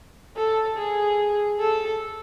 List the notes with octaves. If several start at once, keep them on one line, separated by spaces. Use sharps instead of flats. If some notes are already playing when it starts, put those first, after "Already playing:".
A4
G#4
A4